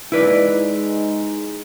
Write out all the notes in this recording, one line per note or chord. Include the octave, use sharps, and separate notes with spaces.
G#3 D#4 E4 B4 D5